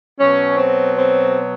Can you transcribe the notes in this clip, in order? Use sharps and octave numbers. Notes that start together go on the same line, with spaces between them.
B2 F#3 C#4
C4
C4